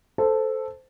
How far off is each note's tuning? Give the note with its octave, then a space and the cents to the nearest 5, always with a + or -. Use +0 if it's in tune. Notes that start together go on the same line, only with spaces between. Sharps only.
A4 +0 C5 -10